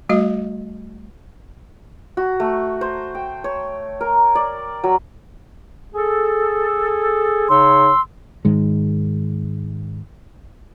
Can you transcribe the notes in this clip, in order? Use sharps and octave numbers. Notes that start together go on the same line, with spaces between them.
G3 A3 F#4 D#5
F#4
A3
C5
G5
C#5
A#4
D5
F#3
G#4 A4
C#3 D#4 C#5 C6 E6
G#2 D#3 G#3